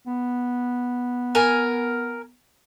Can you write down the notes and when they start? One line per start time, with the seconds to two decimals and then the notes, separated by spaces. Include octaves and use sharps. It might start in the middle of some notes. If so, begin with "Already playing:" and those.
0.07 B3
1.35 A#4 G#5